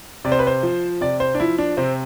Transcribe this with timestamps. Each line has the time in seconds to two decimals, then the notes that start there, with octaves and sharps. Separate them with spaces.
0.25 C3 D5
0.32 C5
0.39 B4
0.47 C5
0.63 F3
1.01 C3 D5
1.20 C5
1.35 D4
1.40 F3 E4
1.58 D4
1.77 C3 C4